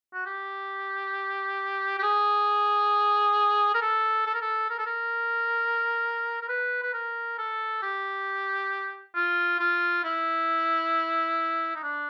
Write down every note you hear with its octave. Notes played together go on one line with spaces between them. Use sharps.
F#4
G4
G4
G#4
A#4
A4
A4
A#4
A4
A#4
A4
A#4
A#4
B4
B4
A#4
A4
G4
F4
F4
E4
D#4
D4